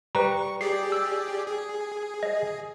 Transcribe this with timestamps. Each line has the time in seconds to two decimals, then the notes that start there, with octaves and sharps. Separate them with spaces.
0.15 G3 B4 A#5 C#6
0.61 G4 G#4 D5 C7
0.92 E6
1.47 G#4
2.23 D#5